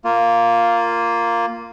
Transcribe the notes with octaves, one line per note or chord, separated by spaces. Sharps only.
A#3 F4